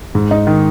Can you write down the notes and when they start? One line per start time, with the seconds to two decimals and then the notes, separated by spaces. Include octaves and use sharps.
0.15 G#2
0.31 D#4
0.47 D#3